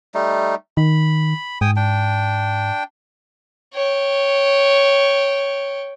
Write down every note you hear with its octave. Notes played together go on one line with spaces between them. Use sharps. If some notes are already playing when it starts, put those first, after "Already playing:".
G3 A3 D#4
D#3 B5
G#2 G5 G#5 D#6
D4 G5
C#5 G5